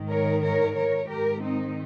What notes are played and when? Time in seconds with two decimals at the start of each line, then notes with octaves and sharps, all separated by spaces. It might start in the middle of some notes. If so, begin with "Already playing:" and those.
Already playing: G#2 D#3
0.09 A#4 C#5
0.43 A#4 C#5
0.76 A#4 C#5
1.09 G#2 D#3 G4 A#4
1.43 C4 D#4